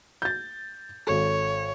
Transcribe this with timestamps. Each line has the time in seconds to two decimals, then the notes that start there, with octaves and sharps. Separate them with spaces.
0.22 G6 A6
1.07 G#1 A4 C#5